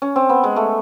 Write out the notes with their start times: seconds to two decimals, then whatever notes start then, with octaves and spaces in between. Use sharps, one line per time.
0.02 C#4
0.16 C4
0.29 B3
0.44 G#3
0.56 A3